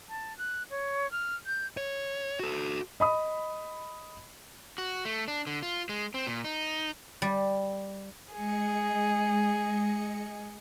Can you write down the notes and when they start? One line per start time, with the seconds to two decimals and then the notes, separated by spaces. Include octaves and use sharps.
0.09 A5
0.38 F#6
0.70 C#5
1.12 F6
1.46 G6
1.77 C#5
2.40 F#4 A4
3.00 D#5 B5 D#6
4.78 F#4
5.05 A3
5.28 D4
5.47 D3
5.63 F4
5.89 G#3
6.14 C4
6.27 A#2
6.44 D#4
7.22 G3
8.32 G#3 G#4 D#5 C#7